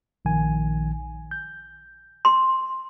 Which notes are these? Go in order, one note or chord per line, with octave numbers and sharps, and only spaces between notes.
A#1 D#3 G#5
G6
C6